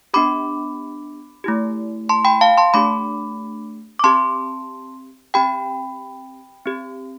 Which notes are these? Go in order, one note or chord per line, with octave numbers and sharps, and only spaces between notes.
B3 D4 G4 B5 D6
A3 E4 G4
A5 C6
G5 B5
F5 A5
A5 C6
A3 D4 G4 B5 D6
D6
C4 G4 A5 C6
C4 G4 G5 B5
C4 G4